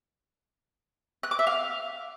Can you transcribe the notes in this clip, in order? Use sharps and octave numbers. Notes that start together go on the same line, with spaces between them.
F#6
D6
E5
F5